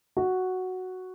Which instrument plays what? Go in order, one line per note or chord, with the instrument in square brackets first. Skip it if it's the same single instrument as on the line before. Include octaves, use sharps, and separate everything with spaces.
[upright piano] F#4